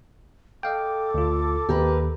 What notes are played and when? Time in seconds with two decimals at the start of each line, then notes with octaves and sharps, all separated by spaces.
0.63 A4 D#5 F5 G5 D6
1.14 D2 F4
1.69 D#2 G4 A#4 B4